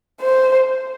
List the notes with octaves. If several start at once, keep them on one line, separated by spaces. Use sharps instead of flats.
C5